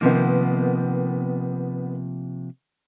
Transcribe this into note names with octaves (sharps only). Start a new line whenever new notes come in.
C3 D#3 F3 A#3 B3